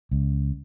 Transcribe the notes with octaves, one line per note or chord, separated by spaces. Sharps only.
C#2